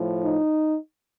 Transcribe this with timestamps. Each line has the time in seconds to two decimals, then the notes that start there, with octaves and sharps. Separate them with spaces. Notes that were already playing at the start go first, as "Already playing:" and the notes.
Already playing: A2 F3
0.23 D#4